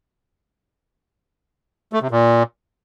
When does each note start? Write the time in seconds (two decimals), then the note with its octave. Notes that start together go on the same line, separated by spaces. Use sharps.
1.93 A3
2.02 C3
2.11 A#2